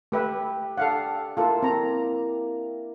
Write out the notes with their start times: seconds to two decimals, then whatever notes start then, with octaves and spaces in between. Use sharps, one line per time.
0.12 A3 G4 B4 E5
0.78 D4 A4 D5 F5 F#5
1.37 A#3 E4 F4 A4
1.63 C4 A#5